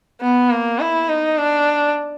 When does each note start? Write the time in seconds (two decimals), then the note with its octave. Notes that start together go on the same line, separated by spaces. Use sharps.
0.21 B3
0.50 A#3
0.79 E4
1.09 D#4
1.38 D4